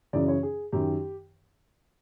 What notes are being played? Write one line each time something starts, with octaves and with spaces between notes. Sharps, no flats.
F#2 C#3 E3 D5
C#5
G#4
F#2 D#3 G4